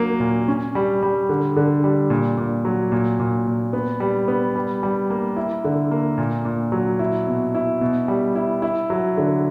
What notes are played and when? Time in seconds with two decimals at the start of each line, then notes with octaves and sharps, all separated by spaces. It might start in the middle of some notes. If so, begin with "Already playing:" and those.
Already playing: F#3 A#3
0.20 A#2
0.48 C#4
0.75 G3
1.03 G3
1.29 D3
1.56 D3
1.84 G3
2.10 A#2
2.37 A#2
2.65 F#3
2.92 A#2
3.20 A#2
3.47 A#2
3.73 B3
4.00 G3
4.28 B3
4.56 G3
4.83 G3
5.10 A#3
5.36 E4
5.64 D3
5.91 A#3
6.18 A#2
6.45 A#2
6.72 F#3
6.99 E4
7.27 B2
7.55 E4
7.81 B2
8.08 G3
8.35 E4
8.62 E4
8.90 F#3
9.17 D3